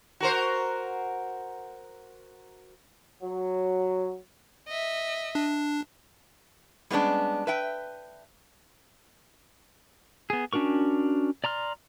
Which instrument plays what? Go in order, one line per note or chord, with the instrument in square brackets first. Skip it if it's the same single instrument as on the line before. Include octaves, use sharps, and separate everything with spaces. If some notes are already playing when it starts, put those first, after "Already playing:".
[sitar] F#4 A#4 C5
[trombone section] F#3
[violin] D#5 E5
[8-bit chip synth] D4
[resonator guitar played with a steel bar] G3 G#3 B3 C#4 D4
B4 E5 G5
[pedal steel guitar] B3 G#4
C#4 D4 F#4 A#4 C#6
D5 A#5 C6 F6